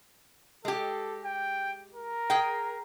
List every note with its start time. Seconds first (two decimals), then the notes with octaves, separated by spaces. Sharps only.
0.65 G#3 G4 A4
1.25 G5
1.94 A#4
2.30 G#4 G5